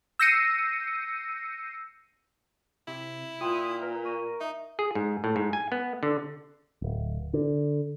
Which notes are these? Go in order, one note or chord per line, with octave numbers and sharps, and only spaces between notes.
E6 G6 A#6 C7 C#7 D#7
C3 E4
A#2 F4 G5 C6 D#6
A#4 B4
C#6 D#7
D#4 E5
G#4
G#2
A2
G#2
G#5
B3
D3
D1
D3